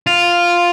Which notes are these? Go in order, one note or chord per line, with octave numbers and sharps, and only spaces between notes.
F4